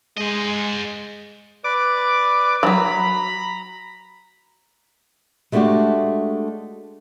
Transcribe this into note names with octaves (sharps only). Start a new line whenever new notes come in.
G#3 C5 D#5
B4 D5 D6
E3 F#3 A#5 B5
G#3 A3 B3 D4 F#4 G4